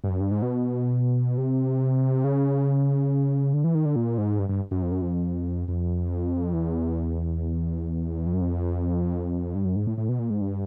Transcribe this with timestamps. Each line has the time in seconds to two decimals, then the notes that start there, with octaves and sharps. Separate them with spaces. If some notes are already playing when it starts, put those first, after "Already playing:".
0.04 G2
0.10 F#2
0.20 G2
0.31 G#2
0.42 B2
1.38 C3
2.24 C#3
3.53 D3
3.64 E3
3.75 D#3
3.85 D3
3.96 A#2
4.18 G#2
4.39 G2
4.49 G2
4.71 F#2
4.82 F2
4.92 F#2
5.02 F2
5.68 F2
6.53 E2
8.26 F2
8.33 F#2
8.41 F2
9.55 G2
9.65 F#2
9.76 G#2
9.87 A2
9.98 A2
10.09 B2
10.19 A#2
10.30 G#2
10.41 G2